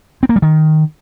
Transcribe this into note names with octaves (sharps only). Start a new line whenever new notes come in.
C4
A#3
G3
D#3